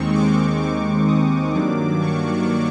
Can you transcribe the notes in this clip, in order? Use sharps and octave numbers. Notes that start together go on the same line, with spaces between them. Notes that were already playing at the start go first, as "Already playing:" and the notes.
Already playing: D#2 D#3 G#3 C4 D#4 C#6
D6
D6
D#6
G2 D#3 F#3 A#3 D4 D6
C#6